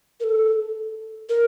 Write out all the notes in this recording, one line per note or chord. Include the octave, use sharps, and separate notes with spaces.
A#4
A4
A#4